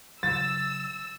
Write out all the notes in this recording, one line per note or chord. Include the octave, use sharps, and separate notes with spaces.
C#3 F#3 E6 A6